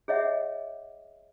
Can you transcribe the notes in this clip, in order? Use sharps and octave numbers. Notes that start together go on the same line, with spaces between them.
G#4 C#5 D#5 E5 F#5